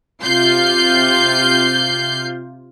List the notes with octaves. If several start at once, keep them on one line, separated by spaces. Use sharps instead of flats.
C3 F4 G6 C7